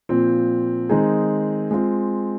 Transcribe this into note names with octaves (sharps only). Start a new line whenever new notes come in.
A#2 F3 C4
D#3 G#3 C4 D#4 G#4
G#3 C4 F4